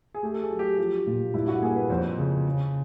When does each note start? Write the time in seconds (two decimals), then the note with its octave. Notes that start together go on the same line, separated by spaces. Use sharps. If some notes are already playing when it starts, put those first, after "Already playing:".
0.14 G#4
0.23 A3 G4
0.34 A4
0.42 G#4
0.50 F#3
0.59 G4
0.78 F3 G4
1.06 A#2
1.34 G2 E4
1.48 F#4
1.62 A#3 G#4
1.76 B4
1.90 F2 C5
2.18 C#3
2.46 C#3